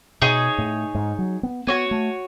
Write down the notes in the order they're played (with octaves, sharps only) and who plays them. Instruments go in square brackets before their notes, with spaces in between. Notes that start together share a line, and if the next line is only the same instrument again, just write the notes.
[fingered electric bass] B2 [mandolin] D#4 G#4 C#5
[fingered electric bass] A2
G#2
F#3
B3
[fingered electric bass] B3 [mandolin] F#4 C#5 G#5
[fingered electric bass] A3